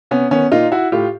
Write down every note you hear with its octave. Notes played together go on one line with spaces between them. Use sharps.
C3 B3 C#4
D#3 B3 C#4
A#2 D#4 F4
E4 F#4
A2 F4 G4